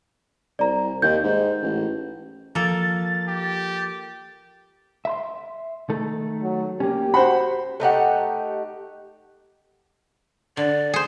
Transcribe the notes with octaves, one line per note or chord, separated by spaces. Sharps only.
C2 D5 A#5
D#2 G6
G#2
A1
F3 A#3 A4 A6
G4
E5 B5 C6
D#3 A3 A4
F#3
A#3 C#4 G4
F#4 C5 F#5 B5
A3 D#4 G4 F#5
D3 D5
G#4 C5